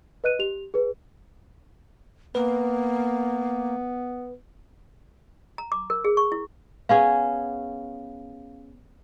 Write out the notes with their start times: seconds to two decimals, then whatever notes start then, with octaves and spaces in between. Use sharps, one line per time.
0.24 B4 D#5 F#6 D#7
0.39 G4 F7
0.74 G#4 B4
2.35 A#3 B3 B4
5.58 A#5
5.72 D6
5.90 A#4
6.05 G#4
6.17 C#6
6.32 E4
6.89 B3 C#4 G#4 F5